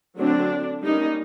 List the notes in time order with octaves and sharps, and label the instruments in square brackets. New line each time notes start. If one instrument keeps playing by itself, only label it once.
[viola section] D3 F#3 A3 C4 D4
G3 A#3 C#4 D#4